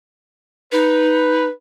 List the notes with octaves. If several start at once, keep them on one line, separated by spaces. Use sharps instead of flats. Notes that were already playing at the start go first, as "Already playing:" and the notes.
D#4 B4